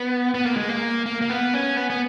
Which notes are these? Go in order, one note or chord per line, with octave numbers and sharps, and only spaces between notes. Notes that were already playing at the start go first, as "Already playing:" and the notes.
Already playing: B3
B3
A#3
G#3
A#3
A#3
A#3
B3
C#4
B3
B3